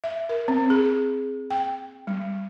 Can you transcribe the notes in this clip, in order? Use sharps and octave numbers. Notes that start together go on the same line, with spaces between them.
E5
A#4
C4
G#4
G5
G3